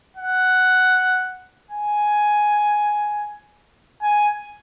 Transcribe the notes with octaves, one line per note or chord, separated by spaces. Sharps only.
F#5
G#5
G#5